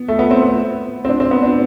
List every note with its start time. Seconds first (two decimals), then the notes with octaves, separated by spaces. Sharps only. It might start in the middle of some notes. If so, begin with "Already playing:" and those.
Already playing: B3
0.08 A3
0.19 B3
0.31 C4
0.42 B3
1.05 C4
1.09 D4
1.20 C4
1.31 B3
1.42 D4